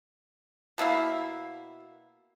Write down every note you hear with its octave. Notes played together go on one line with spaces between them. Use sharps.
B2 A#3 E4 F5